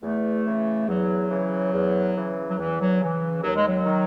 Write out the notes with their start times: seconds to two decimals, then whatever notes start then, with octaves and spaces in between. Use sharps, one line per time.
0.02 E2 A3
0.45 C#3 E3
0.88 E2 F#3
1.30 C#3 E3
1.73 E2
2.16 C#3 E3
2.48 F#3
2.58 E2 E3
2.79 F#3
3.01 C#3 E3
3.43 D#2 F#3
3.55 G#3
3.67 F#3
3.86 D#3